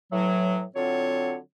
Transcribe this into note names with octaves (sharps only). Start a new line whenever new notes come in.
A2 E3 F#3
D3 F#3 C4 F4 C#5